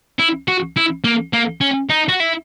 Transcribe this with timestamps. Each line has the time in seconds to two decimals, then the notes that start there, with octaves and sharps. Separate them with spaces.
0.19 E4
0.48 F#4
0.77 E4
1.04 A#3
1.33 A#3
1.61 C#4
1.89 D#4
2.09 F#4
2.20 E4